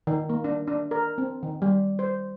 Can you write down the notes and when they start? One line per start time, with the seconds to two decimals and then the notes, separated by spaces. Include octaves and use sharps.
0.07 D#3
0.29 A#3
0.44 D4
0.67 D4
0.91 A#4
1.18 C4
1.43 D#3
1.62 G3
1.99 C5